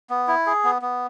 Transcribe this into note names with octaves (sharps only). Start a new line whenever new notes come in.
B3
E4
G#4
B3
B3